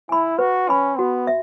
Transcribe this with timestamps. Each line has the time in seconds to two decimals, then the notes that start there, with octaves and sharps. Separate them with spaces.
0.09 E4 G#5 B5
0.39 F#4 B4
0.69 C#4 G#5 B5
0.98 B3 F#4
1.27 E5